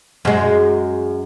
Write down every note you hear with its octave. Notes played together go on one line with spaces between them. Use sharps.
F#2 G#3